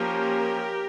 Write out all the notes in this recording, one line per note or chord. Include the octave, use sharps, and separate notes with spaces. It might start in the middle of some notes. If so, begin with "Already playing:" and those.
Already playing: F3 A#3 C#4 G4 A#4